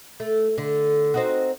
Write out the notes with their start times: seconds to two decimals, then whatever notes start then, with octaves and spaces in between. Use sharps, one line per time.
0.20 A3
0.58 D3
1.14 C4 D#4 F#4